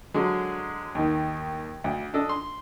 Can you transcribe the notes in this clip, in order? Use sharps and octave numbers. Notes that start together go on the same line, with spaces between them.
D3 F#3 G#3
D#2 D#3
D2
D4 A4 D#5
C6